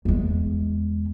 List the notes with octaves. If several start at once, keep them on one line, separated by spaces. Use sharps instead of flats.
E2 G#3